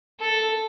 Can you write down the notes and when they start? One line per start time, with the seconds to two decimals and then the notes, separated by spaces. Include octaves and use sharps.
0.21 A4